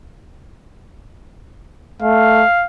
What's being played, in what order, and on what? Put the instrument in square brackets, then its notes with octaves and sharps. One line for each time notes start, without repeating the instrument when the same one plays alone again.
[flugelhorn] A3 [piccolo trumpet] F5